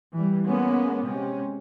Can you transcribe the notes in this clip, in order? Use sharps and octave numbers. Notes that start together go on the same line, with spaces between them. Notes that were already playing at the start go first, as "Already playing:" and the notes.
E3 G3
G#3 A#3 B3 C#4
C3 G#3 C#4